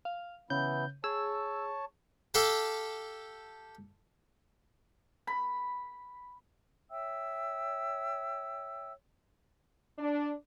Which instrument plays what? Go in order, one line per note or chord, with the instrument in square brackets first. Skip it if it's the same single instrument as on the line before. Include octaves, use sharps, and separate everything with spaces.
[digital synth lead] F5
[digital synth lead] C#3 [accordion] E3 B3 E4 [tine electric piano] G6
[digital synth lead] G#4 [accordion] C#5 A5 [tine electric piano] E6
[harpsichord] G4 A4 F5 G5 A5
[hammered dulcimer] B5
[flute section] C#5 E5 G5 E6
[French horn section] D4